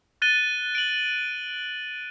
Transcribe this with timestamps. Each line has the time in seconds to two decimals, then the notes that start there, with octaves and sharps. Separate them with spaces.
0.22 F#6 A6 D#7 G7
0.75 D7 F#7